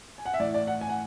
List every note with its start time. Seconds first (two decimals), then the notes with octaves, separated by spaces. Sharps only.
0.18 G#5
0.25 F#5
0.34 E5
0.40 A2 D5
0.44 E3
0.54 D5
0.67 F#5
0.81 G#5
0.89 F#5